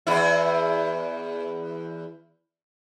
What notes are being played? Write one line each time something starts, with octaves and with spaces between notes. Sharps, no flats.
E2 E4